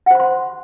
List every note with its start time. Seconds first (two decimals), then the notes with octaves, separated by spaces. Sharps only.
0.06 F#5
0.11 C5
0.15 B5
0.20 C6